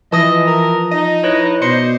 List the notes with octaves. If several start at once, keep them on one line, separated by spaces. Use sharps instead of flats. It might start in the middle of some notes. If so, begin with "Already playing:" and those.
E3 F3 D#5 A5 D#6 A#6
A#4
D#4 D#5
E4 B4 C#5
B2 C5 D5 D#5 C6 C#7